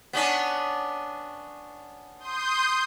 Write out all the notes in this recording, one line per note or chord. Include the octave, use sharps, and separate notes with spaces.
B3 C#4 D4
C6 D#6 G6